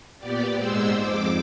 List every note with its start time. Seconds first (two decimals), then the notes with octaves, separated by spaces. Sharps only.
0.19 A#2 B3 G4 D5
0.54 G#2 G#3 C5 E6
0.97 F2 D6